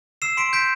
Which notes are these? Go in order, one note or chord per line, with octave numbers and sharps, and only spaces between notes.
E6 C7 E7
C6 B6 D7
G6 B6 D7